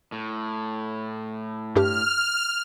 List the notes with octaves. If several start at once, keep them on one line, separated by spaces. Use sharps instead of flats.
A2
G2 D4 G4 F6